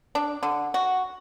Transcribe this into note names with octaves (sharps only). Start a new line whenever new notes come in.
D4
D3
F#4